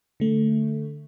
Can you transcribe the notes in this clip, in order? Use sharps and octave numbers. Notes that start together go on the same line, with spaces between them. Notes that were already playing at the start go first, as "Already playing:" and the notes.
D3 A3